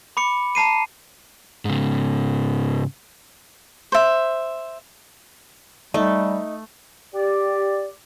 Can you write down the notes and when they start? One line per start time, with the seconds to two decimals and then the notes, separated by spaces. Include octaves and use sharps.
0.17 B5 D6 C#7
0.55 A5 A#5 C7 D#7
1.65 G#2 C#3
3.92 C5 E5
5.94 G3 A3 D#4
7.14 G4 D5